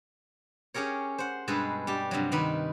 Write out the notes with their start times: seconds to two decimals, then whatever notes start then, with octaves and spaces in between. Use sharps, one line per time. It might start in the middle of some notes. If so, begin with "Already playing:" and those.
0.74 C#4 G4 G#4 A#4 C#5
1.18 C5 F#5
1.48 G2 B2 G#3 G#4 A4 B4
1.87 G3 D4 G4
2.11 G2 C3 F3 F#3
2.32 C3 D#3 D#4 B4 B5